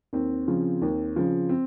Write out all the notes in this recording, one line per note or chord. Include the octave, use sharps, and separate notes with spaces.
D#2 C4
C#3 F3
D#2
C#3 F3
C4